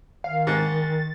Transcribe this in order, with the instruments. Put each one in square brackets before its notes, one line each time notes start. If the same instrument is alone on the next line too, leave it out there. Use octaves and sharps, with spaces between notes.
[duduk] D#3 [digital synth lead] F5
[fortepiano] G#2 [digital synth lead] A6